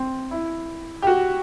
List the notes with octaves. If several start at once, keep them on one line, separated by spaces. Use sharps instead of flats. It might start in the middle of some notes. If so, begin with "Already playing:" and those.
Already playing: C4
E4
G4
F#4